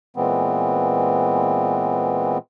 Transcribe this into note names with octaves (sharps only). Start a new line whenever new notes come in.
A#2 E3 G#3 B3 C4